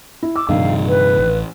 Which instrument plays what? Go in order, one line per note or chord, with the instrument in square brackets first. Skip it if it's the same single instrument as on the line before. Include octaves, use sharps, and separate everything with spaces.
[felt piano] E4
[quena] D6 [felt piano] E6
[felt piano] A#1 D#3 [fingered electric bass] G2 C3 [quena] F5
[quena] B4
[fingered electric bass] A1